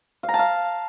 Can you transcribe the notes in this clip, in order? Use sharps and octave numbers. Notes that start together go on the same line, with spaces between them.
F5
A#5
A5
F5